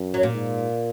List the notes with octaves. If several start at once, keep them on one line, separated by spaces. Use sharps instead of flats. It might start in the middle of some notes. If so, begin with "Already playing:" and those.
Already playing: F#2
F#3
A#2
G#2